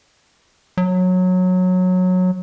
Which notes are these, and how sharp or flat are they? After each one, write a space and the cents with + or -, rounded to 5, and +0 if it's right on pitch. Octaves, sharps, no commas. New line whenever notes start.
F#3 -15